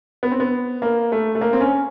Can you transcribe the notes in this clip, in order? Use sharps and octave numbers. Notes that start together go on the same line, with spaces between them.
B3
C4
B3
A#3
A3
A3
A#3
C4
C#4